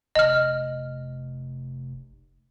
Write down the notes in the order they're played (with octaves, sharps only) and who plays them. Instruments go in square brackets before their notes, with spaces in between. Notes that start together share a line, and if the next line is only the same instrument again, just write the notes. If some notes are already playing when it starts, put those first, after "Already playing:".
[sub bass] F1 [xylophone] D#5 F6